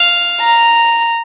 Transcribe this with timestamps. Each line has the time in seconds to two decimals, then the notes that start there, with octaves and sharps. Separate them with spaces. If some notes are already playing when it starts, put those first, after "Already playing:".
Already playing: F5
0.41 A#5